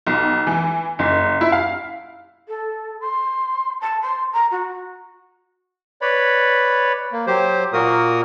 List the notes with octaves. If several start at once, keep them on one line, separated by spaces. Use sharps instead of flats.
B1
E3
F#1
E4
F5
A4
C6
A5
C6
A#5
F#4
B4 C#5 D5 B5
A#3
F#3 G4 C5
A#2 A#3 F#4 A#4 D#6